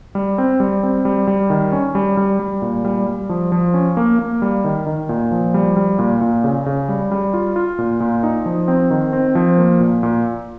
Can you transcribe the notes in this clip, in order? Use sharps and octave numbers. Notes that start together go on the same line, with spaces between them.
G3
C4
G3
C4
G3
G3
D#3
C#4
G3
G3
G3
A#2
G3
G3
F3
F3
C#4
A#3
A#3
G3
D#3
D#3
A#2
F3
G3
G3
A#2
A#2
C#3
C#3
G3
G3
F4
F4
A#2
A#2
D#4
F3
C4
D#3
C4
F3
A#3
A#2
A#2